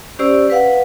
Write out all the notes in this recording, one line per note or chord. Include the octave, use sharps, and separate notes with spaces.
C#4 G4 C5 D5 E6
B4 F5 F#5